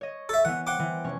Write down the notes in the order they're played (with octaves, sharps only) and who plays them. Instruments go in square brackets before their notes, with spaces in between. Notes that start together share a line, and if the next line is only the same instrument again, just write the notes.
[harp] C#5 D#5
[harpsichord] A4 E5
[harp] E3 B3 [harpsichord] F#5
[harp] C5 G5 [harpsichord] F#5 D6
[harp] E3
F1 C#4 C#6